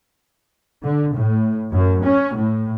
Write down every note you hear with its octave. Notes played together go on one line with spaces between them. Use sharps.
D3
A2
F#2
C#4
A2